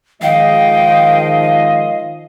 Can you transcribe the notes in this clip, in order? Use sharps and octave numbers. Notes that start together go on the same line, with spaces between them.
D#3 F3 G#3 D#5 F5 G5